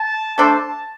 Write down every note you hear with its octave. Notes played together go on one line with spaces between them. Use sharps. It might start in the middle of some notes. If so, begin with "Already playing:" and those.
Already playing: A5
A3 D4 A4 C5 A5